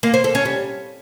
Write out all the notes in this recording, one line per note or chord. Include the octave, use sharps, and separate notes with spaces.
A#3
C5
A4
C#4
G3